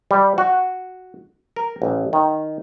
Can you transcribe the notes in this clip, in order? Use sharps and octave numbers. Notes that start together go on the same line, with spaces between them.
G3
F#4
A#4
A1
D#3